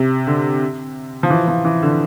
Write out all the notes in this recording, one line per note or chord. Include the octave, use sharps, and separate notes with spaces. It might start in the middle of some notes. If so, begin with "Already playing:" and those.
Already playing: C3
D3
F3
E3
F3
E3
D3